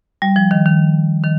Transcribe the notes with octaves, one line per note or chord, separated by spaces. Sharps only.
G3
F3
D#3
D#3
D#3